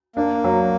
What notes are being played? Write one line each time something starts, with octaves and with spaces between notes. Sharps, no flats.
A#3 D4
F#3